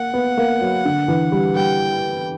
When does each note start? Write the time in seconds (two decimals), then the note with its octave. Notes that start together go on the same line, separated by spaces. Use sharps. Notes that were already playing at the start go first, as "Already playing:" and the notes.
Already playing: A#3 F#5
0.14 B3
0.38 A#3
0.61 F#3
0.85 D3
1.08 E3
1.32 G3
1.56 G3 G5